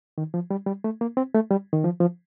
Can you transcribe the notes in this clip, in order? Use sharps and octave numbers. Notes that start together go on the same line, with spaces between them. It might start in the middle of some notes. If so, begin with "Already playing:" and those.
D#3
F3
G3
G3
A3
A#3
C4
A3
G3
D#3
F3
F3